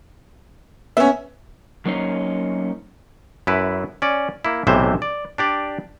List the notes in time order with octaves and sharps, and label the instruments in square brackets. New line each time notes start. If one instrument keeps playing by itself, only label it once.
[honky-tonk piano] B3 C#4 [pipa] E5
[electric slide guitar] F#3 A#3 C#4 D#4 C5
[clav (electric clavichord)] F#2 E4 B4
C#4 D5
A#3 E4
B1 A2 C3 E3 C5 E5
D5
D4 G4 D5